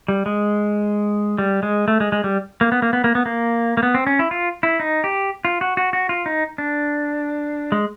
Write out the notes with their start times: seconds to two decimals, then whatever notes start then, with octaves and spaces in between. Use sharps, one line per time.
0.08 G3
0.26 G#3
1.38 G3
1.63 G#3
1.88 A3
2.00 G#3
2.12 G#3
2.24 G3
2.61 A#3
2.72 B3
2.82 A#3
2.93 B3
3.04 A#3
3.15 B3
3.26 A#3
3.77 A#3
3.83 B3
3.95 C4
4.07 C#4
4.19 E4
4.31 F4
4.63 E4
4.80 D#4
5.04 G4
5.45 F4
5.61 F#4
5.77 F#4
5.93 F#4
6.09 F4
6.26 D#4
6.58 D4
7.72 G#3